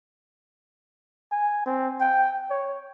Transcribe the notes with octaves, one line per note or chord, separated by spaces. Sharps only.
G#5
C4
G5
C#5